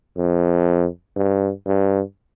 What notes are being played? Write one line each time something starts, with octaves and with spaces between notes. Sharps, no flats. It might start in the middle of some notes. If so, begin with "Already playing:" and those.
F2
G2
G2